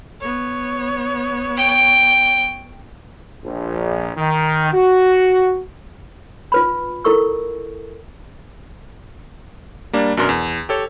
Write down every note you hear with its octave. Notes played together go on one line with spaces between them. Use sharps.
B3 C#5
G5
A#1
D#3
F#4
F4 B4 B5
E4 A4 A#4 D#5 C#6 E6
G3 A#3 D4
F#2 B2 D4 A#4 C6
E2
G4 A4 C#5